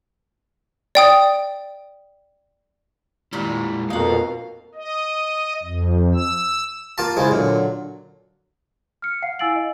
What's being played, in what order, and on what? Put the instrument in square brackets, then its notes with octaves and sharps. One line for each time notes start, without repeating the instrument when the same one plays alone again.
[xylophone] D5 G5 D#6
[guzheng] A#2 D#3 G3 [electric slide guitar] G#3 E4
[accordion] F2 B2 [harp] A#3 D4 F4 [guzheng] D#4 F#5 [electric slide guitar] F5
[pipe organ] D#5
F2
E6
[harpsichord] A#3 F4 A5
[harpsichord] C#2 G#3 [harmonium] E4 C5
[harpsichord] A#2 [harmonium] D3 F#3
[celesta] F6 C#7
F5 F#5 C7
E4 G#5 E6 A6 D7 F#7
D#5